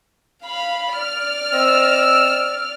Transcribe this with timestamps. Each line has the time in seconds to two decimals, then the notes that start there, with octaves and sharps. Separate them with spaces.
0.44 F5 B5
0.96 D5 F6
1.53 C4 D#5 E6